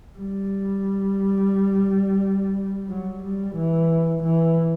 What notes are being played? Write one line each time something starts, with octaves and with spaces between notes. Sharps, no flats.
G3
F#3
G3
E3
E3